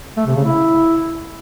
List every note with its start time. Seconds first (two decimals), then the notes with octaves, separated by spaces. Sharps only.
0.17 A3
0.26 C3
0.36 C#3
0.45 E4